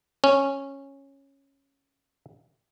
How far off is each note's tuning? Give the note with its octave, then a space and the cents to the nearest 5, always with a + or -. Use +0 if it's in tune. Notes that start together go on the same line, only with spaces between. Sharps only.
C#4 -10